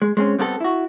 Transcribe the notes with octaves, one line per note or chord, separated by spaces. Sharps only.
G#3
G#3 C4 C#4
G3 B3 C4 E4 A4
E4 F#4